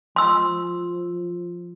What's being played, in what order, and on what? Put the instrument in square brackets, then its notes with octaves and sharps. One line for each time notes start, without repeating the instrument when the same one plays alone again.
[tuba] F3 [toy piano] C6 E6